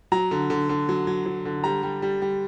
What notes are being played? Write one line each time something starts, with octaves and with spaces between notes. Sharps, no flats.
F#3 A#5
D3
D3
D3
F#3
F#3
F#3
D3
G3 A#5
G3
G3
G3